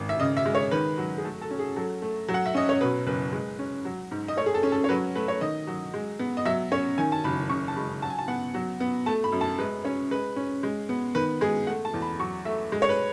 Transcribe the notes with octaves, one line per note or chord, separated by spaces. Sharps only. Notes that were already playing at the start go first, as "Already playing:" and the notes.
Already playing: G#1
E5
C#3 D#5
E5
G#3
C#5
D#3 B4
F#3
G#4
A3 A4
A4
C#4
G#4
F#3 A4
A3
F#3
F#5
E5
C#4 D#5
C#5
B2 B4
F#1 B4
G#3
C#4
F#3
G#2
D#5
A3 C#5
G#4
A4
C#4
A4
C#5
F#3 B4
A3 B4
C#5
D#3 D#5
F#3
G#3
B3
D#5
F#3 E5
C#4 C#5
D#3 G#5
A5
F#1 B5
C#3 C#6
A5
G#3 B5
F#3 A5
G#5
A5
B3 F#5
F#3
B3
A3 A5
B5
F#2
A5
G#3 B4
C#4 C#5
G#3 B4
C#4
G#3
B3
D#3 B4
G#3 G#4
A3 F#5
A5
E2
B5
F#3 C#6
A3 E5
G#3
C#5
B4